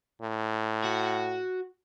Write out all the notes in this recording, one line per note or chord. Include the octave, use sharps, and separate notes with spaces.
A2
F#4